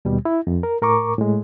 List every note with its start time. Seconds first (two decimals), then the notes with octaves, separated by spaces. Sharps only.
0.05 D#2 B2 G3
0.25 E4
0.47 F2
0.63 A#4
0.82 A2 A#4 A#5 C#6 D6
1.18 A2 G#3